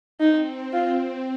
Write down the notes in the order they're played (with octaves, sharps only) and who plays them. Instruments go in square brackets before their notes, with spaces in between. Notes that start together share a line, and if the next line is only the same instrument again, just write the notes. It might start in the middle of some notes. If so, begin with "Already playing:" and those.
[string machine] C4 [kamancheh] D#4
[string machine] C4 [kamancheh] F4